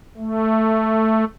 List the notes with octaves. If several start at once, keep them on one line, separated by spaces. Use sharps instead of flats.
A3